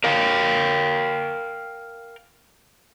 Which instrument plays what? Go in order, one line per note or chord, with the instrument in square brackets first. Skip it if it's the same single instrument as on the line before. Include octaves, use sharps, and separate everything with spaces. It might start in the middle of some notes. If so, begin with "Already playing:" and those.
[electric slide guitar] A#4 F5 G5